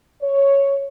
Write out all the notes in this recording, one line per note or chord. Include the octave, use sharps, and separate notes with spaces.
C#5